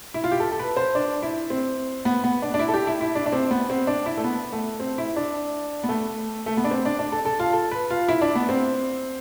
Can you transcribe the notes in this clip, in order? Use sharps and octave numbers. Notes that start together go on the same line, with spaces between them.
E4
F4
G4
A4
A4
B4
C5
D4
E4
C4
B3
B3
D4
D4
E4
A4
G4
E4
E4
D4
D4
C4
B3
C4
D4
E4
A3
B3
A3
C4
E4
D4
B3
A3
A3
B3
D4
C4
D4
D4
A4
A4
F4
A4
B4
F4
E4
D4
B3
C4